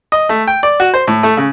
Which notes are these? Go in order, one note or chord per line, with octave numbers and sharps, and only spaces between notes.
D#5
A3
G5
D5
F#4
C5
A2
A3
C#3